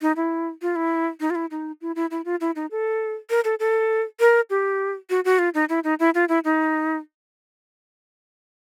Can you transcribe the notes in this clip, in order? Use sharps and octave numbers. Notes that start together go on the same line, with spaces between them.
D#4
E4
F4
E4
D#4
F4
E4
D#4
E4
E4
E4
F4
E4
D#4
A4
A#4
A4
A4
A#4
G4
F#4
F#4
F4
D#4
E4
D#4
E4
F4
E4
D#4